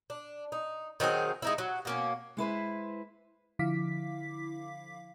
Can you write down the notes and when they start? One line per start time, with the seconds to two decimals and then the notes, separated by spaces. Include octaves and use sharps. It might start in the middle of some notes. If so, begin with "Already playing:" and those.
0.10 D4
0.52 D#4
1.00 D#3 F#3 C4 G#4
1.42 G#3 D#4 E4
1.58 F#3
1.85 B2 A#3 C#4
2.37 G#3 E4 B4 C5
3.59 D3 F3 E4 F5 D6 B6